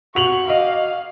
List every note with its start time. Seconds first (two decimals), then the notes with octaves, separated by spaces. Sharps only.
0.15 F#4 C#6 F7 F#7
0.47 D#5 F5 D6